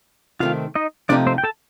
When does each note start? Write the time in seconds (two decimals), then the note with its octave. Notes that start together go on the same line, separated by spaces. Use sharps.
0.40 C3 D#3 A3 C4 F4 F5
0.75 D#4 D#5
1.09 C3 F3 A3 D4 D#4 G4 D5
1.27 C4 C5
1.38 G5
1.44 A4 A5